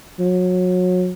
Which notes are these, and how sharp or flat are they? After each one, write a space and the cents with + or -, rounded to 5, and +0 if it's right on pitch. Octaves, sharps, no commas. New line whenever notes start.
F#3 -30